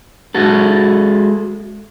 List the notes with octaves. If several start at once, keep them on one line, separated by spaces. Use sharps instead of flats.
G#3 F#4 A4